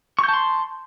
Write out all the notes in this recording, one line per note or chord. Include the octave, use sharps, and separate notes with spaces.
A5 C6 C#6 G6